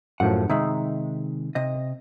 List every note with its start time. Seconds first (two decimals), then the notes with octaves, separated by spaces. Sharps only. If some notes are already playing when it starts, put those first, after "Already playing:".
0.20 F#2 A2 F3 F#5
0.50 C3 D#3 G#3 D#4 E5
1.55 C3 D#5